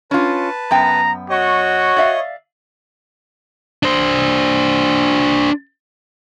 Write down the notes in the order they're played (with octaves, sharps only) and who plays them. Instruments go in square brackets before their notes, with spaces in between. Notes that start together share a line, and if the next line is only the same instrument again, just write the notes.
[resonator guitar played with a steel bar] C#4 F4 [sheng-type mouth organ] B4 A5
[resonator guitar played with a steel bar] F#2 B3 G5 [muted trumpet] A#5
[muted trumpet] F#4 [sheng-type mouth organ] C#5 D#5
[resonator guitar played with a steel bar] D5 E5 F5
[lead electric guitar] D4 C5